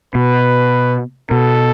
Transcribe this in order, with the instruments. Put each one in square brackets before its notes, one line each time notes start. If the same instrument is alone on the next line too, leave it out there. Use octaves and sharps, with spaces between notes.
[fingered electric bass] B2 [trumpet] B4
[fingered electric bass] B2 [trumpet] A4